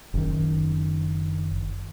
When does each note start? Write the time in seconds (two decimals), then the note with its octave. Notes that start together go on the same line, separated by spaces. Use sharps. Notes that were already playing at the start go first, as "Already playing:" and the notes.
0.14 F#1 D#3